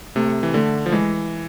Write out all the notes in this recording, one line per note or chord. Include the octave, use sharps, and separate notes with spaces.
C3 A3
E3
D3 A3
F3
E3 G#3